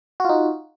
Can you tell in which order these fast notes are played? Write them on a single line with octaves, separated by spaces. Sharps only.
F#4 F4 D#4